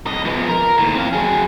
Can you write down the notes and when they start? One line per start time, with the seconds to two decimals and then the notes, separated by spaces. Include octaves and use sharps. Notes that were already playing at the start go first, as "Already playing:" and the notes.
0.06 C2 D#5
0.25 F3 B3
0.48 A#4
0.78 D#2 A2
0.95 C4 F5
1.13 F#3 G#4